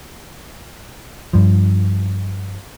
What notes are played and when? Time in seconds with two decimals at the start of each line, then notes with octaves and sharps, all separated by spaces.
1.33 G2 F3